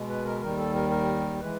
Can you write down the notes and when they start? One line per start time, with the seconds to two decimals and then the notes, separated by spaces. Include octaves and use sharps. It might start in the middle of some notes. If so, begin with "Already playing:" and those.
Already playing: B2 G#3
0.09 B4
0.25 A#4
0.41 D#2 D#3 G3 A#4
0.57 A4
0.75 A#4
0.90 A#4
1.40 E3 G#3 B4